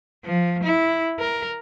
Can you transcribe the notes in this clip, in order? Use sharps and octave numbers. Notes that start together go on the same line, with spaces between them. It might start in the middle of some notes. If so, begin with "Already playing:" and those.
F3
E4
A#4